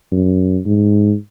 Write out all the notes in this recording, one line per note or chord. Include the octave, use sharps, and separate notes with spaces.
F#2
G#2